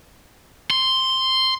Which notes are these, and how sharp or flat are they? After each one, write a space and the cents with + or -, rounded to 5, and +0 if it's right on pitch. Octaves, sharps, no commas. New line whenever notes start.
C6 +0